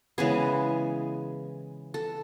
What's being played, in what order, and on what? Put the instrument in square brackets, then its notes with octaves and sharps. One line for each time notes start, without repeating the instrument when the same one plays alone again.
[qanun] C#3 E3 G#3 B3 G#4
A4